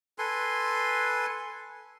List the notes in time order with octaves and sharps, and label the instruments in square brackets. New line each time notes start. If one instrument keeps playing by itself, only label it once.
[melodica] A4 B4 G#5 C6